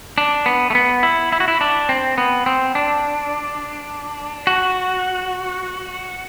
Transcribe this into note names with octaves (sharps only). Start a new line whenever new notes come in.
D4
B3
A3
B3
E4
E4
F#4
E4
D4
C4
B3
C4
D4
F#4